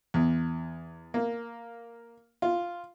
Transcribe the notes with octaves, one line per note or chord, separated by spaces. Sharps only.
E2
A#3
F4